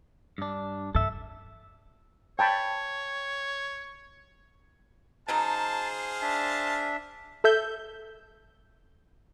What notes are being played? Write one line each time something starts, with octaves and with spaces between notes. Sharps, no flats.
G2 D4
G2 C#3 A4 E5
C#5 G5 A5 B5
C#3 F#3 D#4 G#4 C5 F5 A5
D4 E5 A5
A4 E5 G6